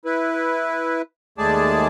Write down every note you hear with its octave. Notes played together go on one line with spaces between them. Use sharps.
E4 B4
D#2 G#3 A3 G#4 D5 A5